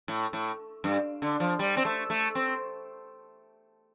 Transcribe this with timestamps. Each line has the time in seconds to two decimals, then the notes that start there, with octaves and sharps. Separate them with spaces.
0.08 A2
0.33 A2
0.84 G2
1.22 D3
1.40 F3
1.59 G3
1.77 C4
1.85 A3
2.10 A3
2.35 C4